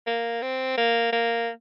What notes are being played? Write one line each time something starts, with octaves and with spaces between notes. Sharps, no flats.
A#3
C4
A#3
A#3